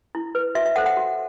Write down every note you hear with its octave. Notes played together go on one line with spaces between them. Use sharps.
E4
B4
F#4 E5
E5
A4 C5 F#5
F#5
F#4